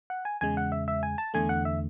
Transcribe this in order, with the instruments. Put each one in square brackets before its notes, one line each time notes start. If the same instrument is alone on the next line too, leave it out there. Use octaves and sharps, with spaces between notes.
[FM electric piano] F#5
G#5
E2 C#3 G#3 G#5
F#5
E5
E5
G#5
A5
E2 D3 A3 G#5
F#5
E5